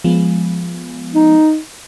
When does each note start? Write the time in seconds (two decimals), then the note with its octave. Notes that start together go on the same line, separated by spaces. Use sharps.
0.04 F3 G#3 B3
1.15 D#4